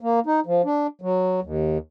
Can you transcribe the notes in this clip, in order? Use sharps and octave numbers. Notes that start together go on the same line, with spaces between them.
A#3
D#4
F3
D4
F#3
D#2